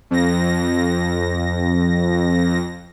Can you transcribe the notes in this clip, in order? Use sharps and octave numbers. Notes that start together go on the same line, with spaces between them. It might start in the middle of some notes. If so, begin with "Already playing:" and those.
F2 A#6